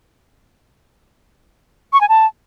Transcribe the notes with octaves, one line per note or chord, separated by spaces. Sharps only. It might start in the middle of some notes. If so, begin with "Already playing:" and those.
C#6
G#5
A5